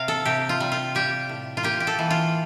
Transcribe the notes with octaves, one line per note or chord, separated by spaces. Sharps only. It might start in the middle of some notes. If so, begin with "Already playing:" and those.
Already playing: C3 F5
A4
C3 G4
F4
G3
F4
G3 G4
A2
F4
A#3 G4
G4
A4
E3
F4